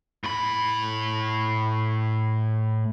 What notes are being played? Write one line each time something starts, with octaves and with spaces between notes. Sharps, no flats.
A2 B5